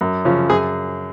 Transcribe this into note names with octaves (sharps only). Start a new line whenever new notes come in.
F#2
C#3 F3
F#2 G#4